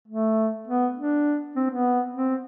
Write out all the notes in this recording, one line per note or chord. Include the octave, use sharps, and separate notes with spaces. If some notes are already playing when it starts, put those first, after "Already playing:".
A3
B3
D4
C4
B3
C4